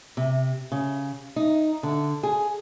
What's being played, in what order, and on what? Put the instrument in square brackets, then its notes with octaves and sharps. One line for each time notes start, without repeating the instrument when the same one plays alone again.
[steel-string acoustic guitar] C3
C#3
D#4
D3
G#4